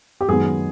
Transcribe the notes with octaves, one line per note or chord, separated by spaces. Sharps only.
G4
F#2 D#3 G#3 B3 G#4